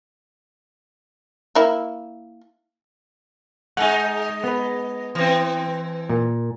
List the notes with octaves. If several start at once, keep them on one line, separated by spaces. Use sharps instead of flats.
A#3 E4
G#3 D#4 F#5 G#5
B3 B4
E3 C4
A#2